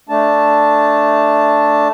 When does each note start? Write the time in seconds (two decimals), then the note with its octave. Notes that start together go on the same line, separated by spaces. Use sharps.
0.09 A3 D4 A5